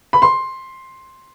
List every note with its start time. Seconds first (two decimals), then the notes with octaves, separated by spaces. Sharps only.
0.13 B5
0.22 C6